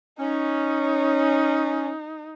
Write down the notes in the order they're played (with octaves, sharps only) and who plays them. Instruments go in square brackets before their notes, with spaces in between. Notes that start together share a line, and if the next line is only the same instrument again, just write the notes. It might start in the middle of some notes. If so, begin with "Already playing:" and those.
[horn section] C#4 [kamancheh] D#4